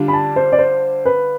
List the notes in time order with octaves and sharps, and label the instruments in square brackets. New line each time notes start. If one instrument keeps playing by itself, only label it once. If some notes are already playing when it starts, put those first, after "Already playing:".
Already playing: [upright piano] D3 G3 D4 F4
[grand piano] B5
A5
C5
D5
C5
B4